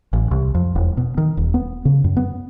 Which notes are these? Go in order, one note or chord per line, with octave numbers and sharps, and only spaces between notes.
A1
C2
F2
E1
B2
D#3
D#1
B3
C#3
F#2
B3